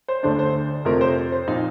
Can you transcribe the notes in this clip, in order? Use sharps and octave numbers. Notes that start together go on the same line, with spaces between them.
C5
D2 D3 A3 D4 C5
C5
F2 C3 F3 A3 C4 A#4
C5
C5
A#2 F3 C4 D#4